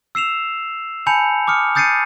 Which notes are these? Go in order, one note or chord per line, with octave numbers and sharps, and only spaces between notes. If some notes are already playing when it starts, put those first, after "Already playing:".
E6 C7 E7 F7
G#5 A5 B5 G6 C#7 F7
D6 D#6 F6 C#7
D#6 G6 A6 C7 C#7 D#7